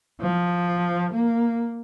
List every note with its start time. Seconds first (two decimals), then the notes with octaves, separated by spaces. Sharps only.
0.21 F3
1.12 A#3